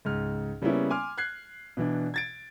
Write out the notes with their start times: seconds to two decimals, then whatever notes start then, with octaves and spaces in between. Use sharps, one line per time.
0.05 C#2 G#2 F6
0.62 C#3 G3 A#3 B3 C#4 E4
0.91 G#5 C6 D6 F6
1.18 F#6 G#6 C7
1.77 B2 E3 D4
2.14 G#6 A6 D7